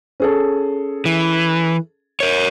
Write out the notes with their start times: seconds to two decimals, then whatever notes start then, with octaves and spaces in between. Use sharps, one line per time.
0.20 C#4 G#4 A4
1.05 E3
2.20 A#4 C#5